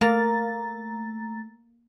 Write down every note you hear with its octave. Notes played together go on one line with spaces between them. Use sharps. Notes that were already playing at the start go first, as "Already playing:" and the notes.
A3 A#3 A#5 A6